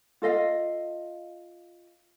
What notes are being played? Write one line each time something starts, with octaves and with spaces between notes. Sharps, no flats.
F4 A4 D#5 F5